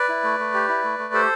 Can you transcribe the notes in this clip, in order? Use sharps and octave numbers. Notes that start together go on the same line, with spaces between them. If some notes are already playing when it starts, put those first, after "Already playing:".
Already playing: B4 D5
E4
A3
A3
G4
E4
A3
A3
G4 A4 C5